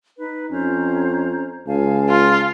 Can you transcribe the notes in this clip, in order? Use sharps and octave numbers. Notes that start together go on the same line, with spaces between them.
D#4 B4
F2 C#4 C5 A#5
C#2 F5 G#5 A5
F4